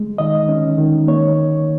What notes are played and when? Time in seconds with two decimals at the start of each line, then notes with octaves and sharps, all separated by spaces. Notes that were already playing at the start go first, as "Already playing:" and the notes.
Already playing: G#3
0.18 D#3 D#5
0.49 C#4
0.78 D#3
1.07 A#3 C#5